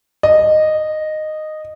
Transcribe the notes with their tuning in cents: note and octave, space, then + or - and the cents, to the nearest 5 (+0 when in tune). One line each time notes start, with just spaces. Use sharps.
D#5 -10